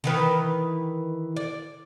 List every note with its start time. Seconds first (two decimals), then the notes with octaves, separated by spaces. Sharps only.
0.04 D#3 E3 B4
1.36 D5